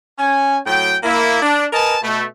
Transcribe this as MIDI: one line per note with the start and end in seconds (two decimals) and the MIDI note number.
0.19 0.58 61
0.19 0.58 80
0.66 0.96 45
0.66 0.96 54
0.66 0.96 79
1.03 1.41 58
1.03 1.41 64
1.42 1.66 62
1.72 1.96 70
1.72 1.96 71
1.72 1.96 75
1.72 1.96 80
1.72 1.96 81
2.02 2.24 47
2.02 2.24 57